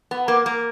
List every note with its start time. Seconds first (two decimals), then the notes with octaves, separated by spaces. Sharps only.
0.11 B3
0.28 A#3
0.46 A#3